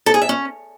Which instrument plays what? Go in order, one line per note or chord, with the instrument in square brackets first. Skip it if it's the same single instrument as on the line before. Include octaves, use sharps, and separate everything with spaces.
[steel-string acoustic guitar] A4
G#4
E5
C#4